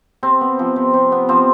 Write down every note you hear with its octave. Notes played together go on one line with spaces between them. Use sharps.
C3 C4
B3
F3
C3
C3
B3
F3 C4